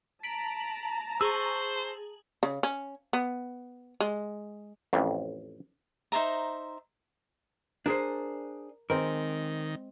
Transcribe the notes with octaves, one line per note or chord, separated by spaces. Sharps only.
A5 A#5 B6 D7 F#7
G#4 C5 C#6 E6 F#7
C#3
C#4
B3
G#3
A1 F2
D#4 C5 E5 A#5
D4 G#4 A#4 C5
D#3 G#3 C4 A#4